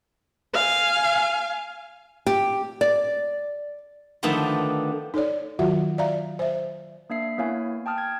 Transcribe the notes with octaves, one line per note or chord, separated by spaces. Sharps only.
F5 G#5
G4
D5
D3 D#3 F3 A3 B3 F4
D#4 A4 C#5 D5
D#3 F#3 F4 F#4 E5 F#5
D5 E5 F5 A#5
C5 E5
A#3 D4 E5 C7
A#3 B3 E4 C#5 F5 G#5
G5 A5 D#6 F6
G#6